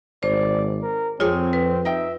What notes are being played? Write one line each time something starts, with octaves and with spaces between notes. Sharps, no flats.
G#1 C5 D5
A#4
F2 C4 F4 G#4 C#5
B4
D#4 E5 G5